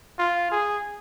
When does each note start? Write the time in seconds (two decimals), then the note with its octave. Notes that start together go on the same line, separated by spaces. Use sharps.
0.19 F4
0.51 G#4